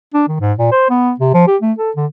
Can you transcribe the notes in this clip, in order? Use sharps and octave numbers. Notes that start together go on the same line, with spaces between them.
D4
D#3
G#2
A#2
C5
B3
C3
F3
G4
A3
A4
D3